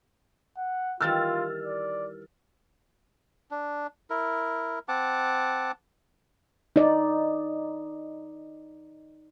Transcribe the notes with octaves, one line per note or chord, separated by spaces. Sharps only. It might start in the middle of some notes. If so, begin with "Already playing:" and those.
F#5
D#3 E3 G3 F4 E6 F6 A6
D5
D4
E4 A#4
C4 F#5 A5 D6
D#4 D5